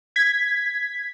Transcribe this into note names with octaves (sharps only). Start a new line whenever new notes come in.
G#6 B6